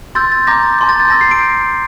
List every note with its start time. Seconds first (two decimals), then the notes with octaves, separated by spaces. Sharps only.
0.15 C6 E6 G6 A6
0.32 A6
0.47 A#5 D6 G6 A#6
0.63 A6
0.79 A5 C6 G6
0.89 A6
1.00 A6
1.10 A5 E6 G6 A#6
1.21 C7
1.31 D7